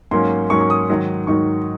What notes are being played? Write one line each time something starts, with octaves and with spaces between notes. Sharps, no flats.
G#2 F#3 A#3 C#4 C6
G#2 F#3 A#3 C#4 C#6
C#6
D#6
G#2 D#3 F#3
G#2 D#3 F#3 C#6